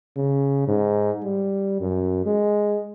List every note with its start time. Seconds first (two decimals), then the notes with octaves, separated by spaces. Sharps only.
0.17 C#3
0.68 G#2
1.23 G3
1.81 F#2
2.26 G#3